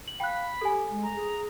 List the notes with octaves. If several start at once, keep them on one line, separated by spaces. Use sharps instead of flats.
F#7
F5 G5 B5 F#6
G4 A4 G#5
G#3
A#5
G#4